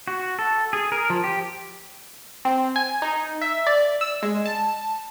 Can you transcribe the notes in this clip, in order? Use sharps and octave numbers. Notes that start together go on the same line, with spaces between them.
F#4
A4
G#4
A#4
F3
G4
C4
G#5
D#4
E5
D5
E6
G#3
A5